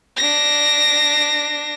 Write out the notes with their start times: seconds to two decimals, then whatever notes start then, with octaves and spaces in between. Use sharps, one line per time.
0.17 D4 A#6